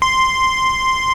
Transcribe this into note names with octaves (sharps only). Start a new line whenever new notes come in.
C6